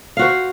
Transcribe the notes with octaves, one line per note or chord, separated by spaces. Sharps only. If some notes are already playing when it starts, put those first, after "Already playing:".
F#4 C5 F5